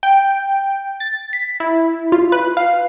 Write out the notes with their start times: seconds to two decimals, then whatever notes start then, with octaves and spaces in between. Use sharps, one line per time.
0.03 G5
1.00 A6
1.33 B6
1.60 E4
2.12 F4
2.32 B4
2.57 F5